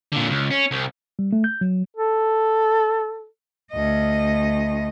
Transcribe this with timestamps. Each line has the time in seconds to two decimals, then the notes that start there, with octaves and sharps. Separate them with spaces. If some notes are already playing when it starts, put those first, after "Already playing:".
0.12 A#2 D3
0.30 C#2
0.51 C#4
0.71 C2
1.19 G3
1.33 A3
1.44 G6
1.61 F#3
1.97 A4
3.72 D2 D#5